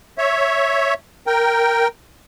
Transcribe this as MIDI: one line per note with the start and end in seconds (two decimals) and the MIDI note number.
0.18 0.94 73
0.18 0.94 76
1.27 1.88 70
1.27 1.88 79